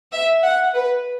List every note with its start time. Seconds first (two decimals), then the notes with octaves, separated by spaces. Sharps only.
0.12 E5
0.43 F#5
0.75 B4